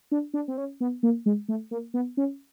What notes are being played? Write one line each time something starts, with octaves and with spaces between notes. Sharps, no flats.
D4
D4
C4
C#4
B3
A#3
G#3
A3
A#3
B3
C#4